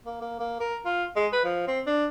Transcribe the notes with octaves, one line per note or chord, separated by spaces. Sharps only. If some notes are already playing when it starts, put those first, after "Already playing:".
A#3
A#3
A#3
A#4
F4
G#3
B4
F3
C4
D4